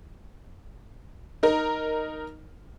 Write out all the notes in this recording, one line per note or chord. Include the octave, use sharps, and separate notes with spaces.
D#4 A#4